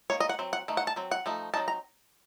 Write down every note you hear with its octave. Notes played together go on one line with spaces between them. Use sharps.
D#3 A#3 C#5
D#5
F#5
F#3 C4
F#5
D#3 A3
F#5
A5
F#3 C4
F#5
F3 A3 D#4
F#3 C4 D#4 A5
A#5